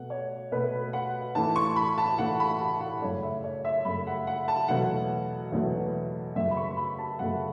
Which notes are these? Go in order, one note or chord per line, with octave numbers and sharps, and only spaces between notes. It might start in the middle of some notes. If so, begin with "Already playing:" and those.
Already playing: B2 A3 F#5
C#5
B2 A3 B4
F#5
A2 E3 A3 A5
C#6
B5
A5
A2 E3 A3 F#5
B5
A5
F#5
F#2 C#3 A3 C#5
E5
C#5
E5
F#2 C#3 A3 B5
F#5
F#5
A5
E2 B2 F#3 A3 F#5
E2 B2 F#3 A3
F#2 C#3 F#3 A3 E5
B5
C#6
B5
A5
F#2 C#3 F#3 A3 F#5